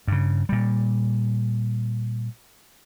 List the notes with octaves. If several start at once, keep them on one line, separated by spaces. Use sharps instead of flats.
G2 C#3
A#2 G3